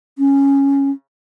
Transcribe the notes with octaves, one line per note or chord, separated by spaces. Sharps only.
C#4